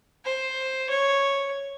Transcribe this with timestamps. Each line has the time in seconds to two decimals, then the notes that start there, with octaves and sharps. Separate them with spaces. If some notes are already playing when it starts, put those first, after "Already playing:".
0.25 C5
0.90 C#5